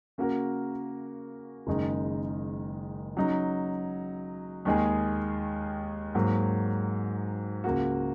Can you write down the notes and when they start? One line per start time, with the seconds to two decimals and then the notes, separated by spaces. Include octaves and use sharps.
0.18 C#3 A#3 F#4 A#4
1.67 F#1 F#2 D#3 G#3 D#4
3.17 C#3 F#3 D#4
4.65 D#2 D#3 G#3 D#4 G#4
6.15 G#2 F#3 A#3
7.64 C#2 C#3 A#3 F#4